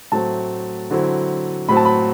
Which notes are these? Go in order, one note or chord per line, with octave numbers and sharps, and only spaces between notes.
A2 F#3 A3 C4 A5
D3 F#3 C4 E4
A2 F#3 C4 B5
A5
B5